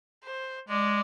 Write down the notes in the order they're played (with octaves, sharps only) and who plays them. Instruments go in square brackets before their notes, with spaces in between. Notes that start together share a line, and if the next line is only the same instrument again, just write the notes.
[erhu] C5
[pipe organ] G#3 [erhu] D5